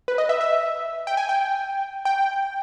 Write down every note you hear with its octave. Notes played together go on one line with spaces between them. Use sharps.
B4
D#5
E5
E5
G5
G#5
G5
G5